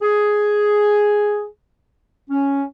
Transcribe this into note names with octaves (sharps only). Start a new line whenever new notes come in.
G#4
C#4